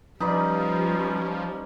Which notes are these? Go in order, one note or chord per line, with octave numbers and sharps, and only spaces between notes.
F3 G3 C#4 D#4 B4 D5